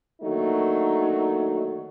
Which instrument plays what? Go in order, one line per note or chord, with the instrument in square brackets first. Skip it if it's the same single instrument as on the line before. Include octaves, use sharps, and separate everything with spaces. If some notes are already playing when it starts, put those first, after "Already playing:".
[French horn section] D3 D#3 F#3 A3 A#3 D#4